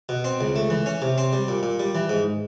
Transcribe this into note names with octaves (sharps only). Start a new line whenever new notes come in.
B2
C4
C#2
A3
E3
C#4
C3
C4
G3
A#2
A#2
G3
E3
G#2